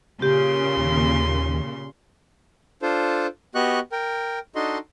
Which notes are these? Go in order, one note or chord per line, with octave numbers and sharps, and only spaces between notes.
A#2 C#3 G4 C6
D#2
D4 F4 A4 C5
B3 F#4 G4 D#5 C#6 F#6
A#4 G5
D4 D#4 F#4 A4 D#5 C6